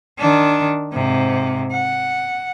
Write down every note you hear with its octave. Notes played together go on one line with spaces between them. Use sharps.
D#3 D4
G#2 C3
F#5